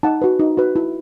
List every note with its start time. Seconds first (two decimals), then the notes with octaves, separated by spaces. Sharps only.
0.03 D#4 F#5 A5
0.22 F#4 B4
0.39 D#4
0.57 F#4 B4
0.76 E4